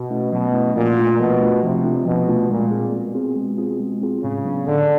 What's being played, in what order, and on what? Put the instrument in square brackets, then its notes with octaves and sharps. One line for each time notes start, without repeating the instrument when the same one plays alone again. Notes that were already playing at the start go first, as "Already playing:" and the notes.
Already playing: [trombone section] B2
[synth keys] A3 C#4 E4
[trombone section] B2 [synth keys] F#3
[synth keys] A3 C#4 E4
[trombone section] A#2 [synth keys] F3
[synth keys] A3 D4 F4
[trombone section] B2 [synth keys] F3
[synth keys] A3 D4 F4
[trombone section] C3 [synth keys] F3
[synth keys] A3 D4 F4
[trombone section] B2 [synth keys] F3
[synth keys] A3 D4 F4
[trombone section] A#2 [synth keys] G#3
[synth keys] C4 F4 G#4
[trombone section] B2 [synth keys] G#3
[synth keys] C4 F4 G#4
G#3
C4 F4 G#4
G#3
C4 F4 G#4
[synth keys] A2 [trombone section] C#3
[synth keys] F#3 B3 D4
[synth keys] A2 [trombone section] D3